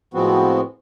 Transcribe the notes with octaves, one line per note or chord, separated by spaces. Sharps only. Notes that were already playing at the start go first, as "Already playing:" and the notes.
A2 F3 G#3 B3 C4 F#4